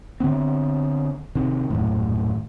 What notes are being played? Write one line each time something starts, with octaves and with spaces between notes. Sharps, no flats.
D3 F#3 B3 C4
C3 D#3
D#1 F#2 A2